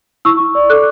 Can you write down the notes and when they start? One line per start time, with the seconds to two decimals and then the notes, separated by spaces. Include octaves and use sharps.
0.25 E4 C#6 E6
0.40 E4
0.55 D5
0.70 A4 D6 F#6